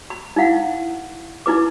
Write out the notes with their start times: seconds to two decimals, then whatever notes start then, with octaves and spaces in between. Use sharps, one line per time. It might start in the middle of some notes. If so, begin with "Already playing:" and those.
0.10 B5
0.36 D#4 E4 F5 F#5
1.46 D#4 E4 B4 D6